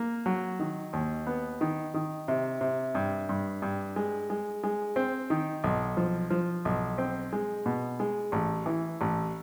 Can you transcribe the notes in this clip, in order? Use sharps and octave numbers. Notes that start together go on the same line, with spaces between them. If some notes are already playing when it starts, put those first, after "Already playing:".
Already playing: A#3
F#3
D#3
D#2
B3
D#3
D#3
C3
C3
G2
G2
G2
G#3
G#3
G#3
C4
D#3
B1
F3
F3
B1
C4
G#3
B2
G#3
A1
E3
A1